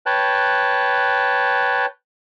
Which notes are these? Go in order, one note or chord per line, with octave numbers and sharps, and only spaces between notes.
B4 C#5 G5 A5 F#6